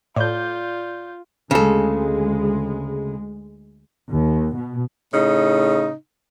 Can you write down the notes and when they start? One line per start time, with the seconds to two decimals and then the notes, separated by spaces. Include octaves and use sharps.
0.16 A2 F4 D5 G6
1.51 D2 C#3 G#3 A4
4.11 D#2
4.55 B2
5.14 A2 C#3 D#4